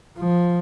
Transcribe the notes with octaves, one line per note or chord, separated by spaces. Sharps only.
F3